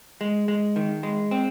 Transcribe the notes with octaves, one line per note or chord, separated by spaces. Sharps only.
G#3
G#3
D#3
G#3
C4